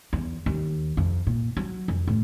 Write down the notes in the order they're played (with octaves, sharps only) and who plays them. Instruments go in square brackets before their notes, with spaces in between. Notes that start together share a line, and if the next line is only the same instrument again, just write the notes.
[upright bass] E2
D#2
F2
A#2
F#3
F2
A2